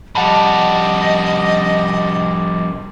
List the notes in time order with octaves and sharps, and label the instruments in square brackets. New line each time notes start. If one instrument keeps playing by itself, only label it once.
[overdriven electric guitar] F2 G3 [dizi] D#5 [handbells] F#5 A5 B5